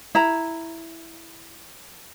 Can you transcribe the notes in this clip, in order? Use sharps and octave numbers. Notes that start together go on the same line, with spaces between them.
E4 A#5